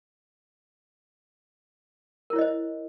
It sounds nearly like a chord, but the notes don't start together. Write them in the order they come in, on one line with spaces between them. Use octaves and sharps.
A#4 E4 C#5 D#5 C5